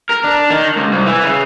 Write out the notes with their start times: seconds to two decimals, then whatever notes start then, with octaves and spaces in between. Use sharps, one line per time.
0.09 A#4
0.24 D4
0.50 D#3
0.76 C#2
0.92 C2
1.06 E3
1.24 C#3